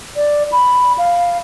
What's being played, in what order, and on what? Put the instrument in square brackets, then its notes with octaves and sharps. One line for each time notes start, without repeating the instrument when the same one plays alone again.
[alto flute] D5
B5
F5